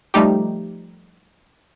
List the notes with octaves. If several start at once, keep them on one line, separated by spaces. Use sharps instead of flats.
F3 G3 A3 D#4 G4